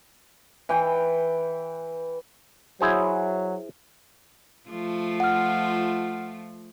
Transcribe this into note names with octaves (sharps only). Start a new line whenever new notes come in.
E3 G5
F#3 E4 G#4 C5
F3 A3 F4
F#5 F6